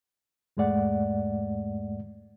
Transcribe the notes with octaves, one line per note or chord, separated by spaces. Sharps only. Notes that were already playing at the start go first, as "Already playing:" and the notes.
E2 G#2 G#3 A3 D5 F#5